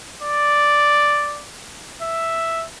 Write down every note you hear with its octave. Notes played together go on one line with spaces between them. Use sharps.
D5
E5